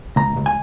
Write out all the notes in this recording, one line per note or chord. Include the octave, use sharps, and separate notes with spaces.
C#2 A#5
C#2
G#5